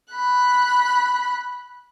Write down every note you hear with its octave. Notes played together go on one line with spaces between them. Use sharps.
B5 F#6